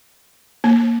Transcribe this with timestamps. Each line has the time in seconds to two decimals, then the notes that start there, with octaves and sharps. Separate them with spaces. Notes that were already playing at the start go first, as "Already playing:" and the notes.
0.64 A#3